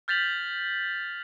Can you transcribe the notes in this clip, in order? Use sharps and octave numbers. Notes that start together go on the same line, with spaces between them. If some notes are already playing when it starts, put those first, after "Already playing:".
F6 G6 A6 B6 F7 F#7